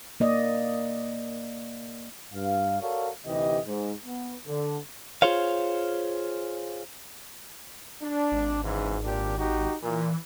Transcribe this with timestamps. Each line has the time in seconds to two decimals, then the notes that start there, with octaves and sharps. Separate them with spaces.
0.20 A#3 D5 D#5
2.34 G2 F5
2.81 F#4 A4 A#4 C#5 D5 F5
3.26 D2 C3 E3 D#4 G4 D#5
3.66 G#2
4.05 B3
4.47 D3
5.22 F4 G#4 C5 C#5 F5
8.02 D4
8.32 G#1
8.65 G#2 C#3 E3
9.04 A#2 D4 G4
9.39 D#4 F#4 G4
9.82 A#2 E3